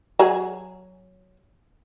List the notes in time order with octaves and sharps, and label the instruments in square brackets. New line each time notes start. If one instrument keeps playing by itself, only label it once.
[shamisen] F#3 G#4